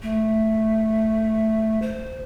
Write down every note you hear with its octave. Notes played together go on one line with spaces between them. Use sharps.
A3
C5